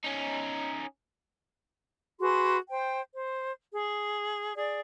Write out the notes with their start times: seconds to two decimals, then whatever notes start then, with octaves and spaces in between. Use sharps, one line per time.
0.04 C#4 D#4
2.20 F#4 G#4 B4 C6
2.69 C5 G5
3.13 C5
3.72 G#4
4.56 G#4 D5